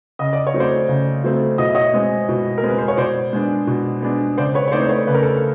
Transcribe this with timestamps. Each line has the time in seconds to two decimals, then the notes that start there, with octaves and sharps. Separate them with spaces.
0.19 C#3 D#5
0.33 D5
0.47 C#5
0.54 F#3 A3 C4
0.60 C5 D5
0.89 C#3
1.24 F#3 A3 C4
1.58 B2 D#5
1.67 E5
1.75 C#5 D#5
1.94 G#3 C4
2.29 B2
2.58 A#4
2.63 G#3 C4 B4
2.78 C5
2.88 C#5
2.97 B2 C5 D5
3.33 G#3 B3 D4
3.67 B2
4.02 G#3 B3 D4
4.37 C#3 C5 D5
4.54 B4 C#5
4.68 C#5
4.72 E3 A3 C4 D#4 C5 D5
4.82 C5
4.89 B4 C#5
5.07 C#3 B4
5.14 A#4
5.22 A4 B4